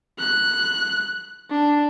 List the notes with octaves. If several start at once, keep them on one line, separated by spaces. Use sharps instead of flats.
F#6
D4